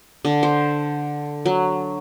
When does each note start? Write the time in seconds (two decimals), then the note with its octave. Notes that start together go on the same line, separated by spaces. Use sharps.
0.25 D3
0.43 C5
1.46 F#3